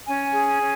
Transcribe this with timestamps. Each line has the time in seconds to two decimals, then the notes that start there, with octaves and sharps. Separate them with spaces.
0.07 C#4 G#5
0.34 G#4
0.60 C#4